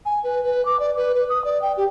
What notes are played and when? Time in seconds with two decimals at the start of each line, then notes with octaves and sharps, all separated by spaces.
0.05 G#5
0.24 B4
0.44 B4
0.65 D6
0.80 D5
0.96 B4
1.15 B4
1.29 D#6
1.45 D5
1.62 G5
1.77 G4